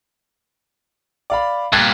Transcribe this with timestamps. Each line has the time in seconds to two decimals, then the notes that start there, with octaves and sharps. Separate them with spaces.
1.30 D5 F5 B5
1.72 G2 A#2 F#6 G#6 A6